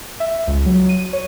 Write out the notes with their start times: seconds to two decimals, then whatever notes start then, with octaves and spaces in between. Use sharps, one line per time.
0.20 E5
0.47 C#2
0.66 F#3
0.89 D#7
1.13 C#5